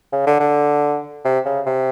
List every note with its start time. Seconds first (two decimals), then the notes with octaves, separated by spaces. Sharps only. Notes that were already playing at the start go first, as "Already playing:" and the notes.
0.12 C#3
0.27 D3
0.40 D3
1.25 C3
1.45 C#3
1.66 C3